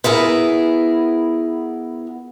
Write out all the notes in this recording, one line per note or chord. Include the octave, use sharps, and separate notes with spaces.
B3 E4 G#4 A#4